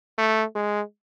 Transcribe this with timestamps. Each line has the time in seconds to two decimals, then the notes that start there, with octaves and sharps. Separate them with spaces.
0.18 A3
0.55 G#3